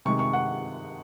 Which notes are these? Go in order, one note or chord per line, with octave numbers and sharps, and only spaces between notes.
C3 D#3 G#3 C#6
C#6
F#5